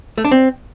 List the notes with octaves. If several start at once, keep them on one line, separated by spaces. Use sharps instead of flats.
A3
D4
C4